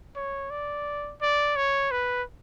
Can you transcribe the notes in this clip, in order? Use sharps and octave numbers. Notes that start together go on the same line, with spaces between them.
C#5
D5
D5
C#5
B4